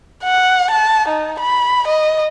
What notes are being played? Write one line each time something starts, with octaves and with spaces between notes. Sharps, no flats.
F#5
A5
D#4
B5
D#5